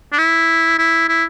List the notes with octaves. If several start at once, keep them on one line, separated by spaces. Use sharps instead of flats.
D4
E4
E4
E4